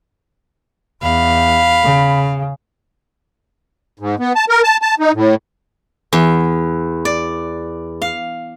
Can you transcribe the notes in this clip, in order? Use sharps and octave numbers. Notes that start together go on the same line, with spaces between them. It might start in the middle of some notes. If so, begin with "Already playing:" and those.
E2 F5 B5
C#3
G#2
B3
A5
A#4
A5
A5
D#4
A2
E2
D5
F5